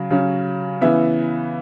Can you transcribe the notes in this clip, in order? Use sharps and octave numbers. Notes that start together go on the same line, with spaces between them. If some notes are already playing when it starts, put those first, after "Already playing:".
Already playing: C#3 F#3
C#3 F#3 C#4
C#3 E3 B3 E5